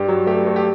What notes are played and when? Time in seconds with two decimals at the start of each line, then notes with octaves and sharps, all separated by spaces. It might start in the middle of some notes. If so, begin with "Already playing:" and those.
Already playing: G2 G4
0.09 F#3
0.27 A3 G4
0.46 A3
0.56 G4